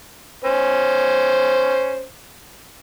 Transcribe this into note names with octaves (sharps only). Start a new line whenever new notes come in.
C#4 C5